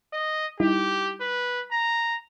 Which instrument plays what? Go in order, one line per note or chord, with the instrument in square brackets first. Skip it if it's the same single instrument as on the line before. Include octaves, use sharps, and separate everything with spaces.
[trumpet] D#5
[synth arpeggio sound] G3 D#4 E4 [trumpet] G4
[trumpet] B4
A#5